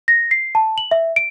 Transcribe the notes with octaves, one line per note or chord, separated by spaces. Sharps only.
A#6
C7
A5
F#7
E5
D7